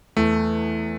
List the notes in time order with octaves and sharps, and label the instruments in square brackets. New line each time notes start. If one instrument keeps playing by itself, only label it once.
[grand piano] E2 [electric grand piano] A3